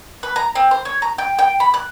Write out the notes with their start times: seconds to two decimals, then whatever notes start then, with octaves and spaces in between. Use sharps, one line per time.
0.23 B4
0.36 A#5
0.55 C4
0.71 C5
0.85 C#5
1.02 A#5
1.18 G5
1.39 G5
1.60 B5
1.74 F#6